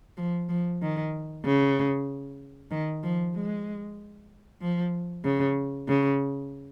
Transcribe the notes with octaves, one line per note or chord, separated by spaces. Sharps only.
F3
F3
D#3
C#3
D#3
F3
G#3
F3
C#3
C#3